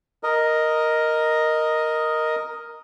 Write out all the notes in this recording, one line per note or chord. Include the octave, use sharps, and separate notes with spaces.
A#4 D#5